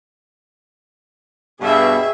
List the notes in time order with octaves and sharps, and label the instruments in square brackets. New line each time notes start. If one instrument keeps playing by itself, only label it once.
[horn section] G2 B2 [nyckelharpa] G#4 E5